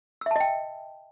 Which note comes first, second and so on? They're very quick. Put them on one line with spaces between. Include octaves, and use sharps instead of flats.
E6 E5 A5 D#5 G5